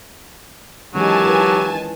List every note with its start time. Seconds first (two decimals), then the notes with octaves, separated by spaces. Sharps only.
0.95 D#3 E3 F#3 G#3 C#4 G4 G#5 A5
1.25 E4 F4 B4